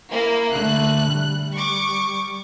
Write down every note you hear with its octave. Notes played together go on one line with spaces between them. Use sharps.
A#3 E4
D3 A3 F#6
G3
C#6 D6